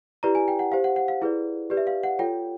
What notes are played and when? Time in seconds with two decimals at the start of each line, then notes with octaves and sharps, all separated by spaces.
0.23 E4 G4 B4 D5 A#5
0.35 G#5
0.48 G5
0.59 F#5
0.72 G4 C5 F5
0.84 F#5
0.96 F#5
1.08 F5
1.22 E4 G#4 B4 D5
1.70 G4 B4 D5
1.77 E5
1.87 F5
2.03 F#5
2.19 F4 A4 C#5 G5